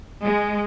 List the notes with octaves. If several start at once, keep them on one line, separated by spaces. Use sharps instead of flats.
G#3